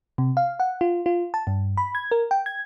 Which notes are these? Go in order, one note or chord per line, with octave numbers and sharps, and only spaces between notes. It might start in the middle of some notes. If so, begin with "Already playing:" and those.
C3
F5
F#5
F4
F4
A5
G2
B5
G#6
A#4
G5
G#6